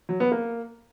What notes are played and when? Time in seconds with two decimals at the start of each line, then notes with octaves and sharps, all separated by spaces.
0.09 F#3
0.20 B3
0.32 A#3